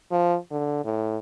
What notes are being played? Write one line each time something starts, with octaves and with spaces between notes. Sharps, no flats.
F3
D3
A2